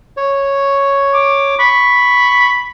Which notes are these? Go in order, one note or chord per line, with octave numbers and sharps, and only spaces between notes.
C#5
D6
B5 C#6